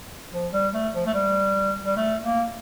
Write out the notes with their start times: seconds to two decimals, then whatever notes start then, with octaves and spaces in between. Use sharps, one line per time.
0.32 F3
0.53 G3
0.74 A3
0.95 F3
1.07 A3
1.14 G3
1.86 G3
1.97 A3
2.24 A#3